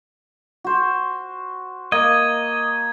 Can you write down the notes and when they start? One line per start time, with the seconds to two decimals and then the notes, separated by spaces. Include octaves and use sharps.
0.64 F#4 C5
1.92 A#3 D#5 G#6